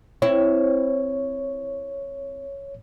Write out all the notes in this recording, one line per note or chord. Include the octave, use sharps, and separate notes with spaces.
C4 E4 C#5